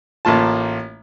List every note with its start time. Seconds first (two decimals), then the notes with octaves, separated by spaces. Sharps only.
0.25 A1 A2 A#3 F4 A5